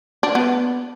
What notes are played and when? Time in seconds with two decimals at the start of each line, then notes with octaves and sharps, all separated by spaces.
0.23 D4
0.35 B3